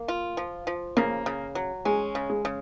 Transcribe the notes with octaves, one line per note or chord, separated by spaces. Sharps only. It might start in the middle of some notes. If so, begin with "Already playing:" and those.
Already playing: A#3
F4
F3
F3
C#3 A#3
C#3
F#3
G#3 C#4
C#3
G#3
C#3